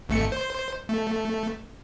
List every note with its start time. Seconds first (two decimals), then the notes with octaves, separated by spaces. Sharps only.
0.09 G#1 A3 C#7
0.32 C5
0.89 A3